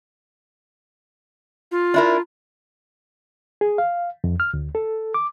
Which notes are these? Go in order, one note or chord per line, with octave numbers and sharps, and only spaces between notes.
F4
D4 E4 A#4
G#4
F5
F2
F6
D2
A4
D6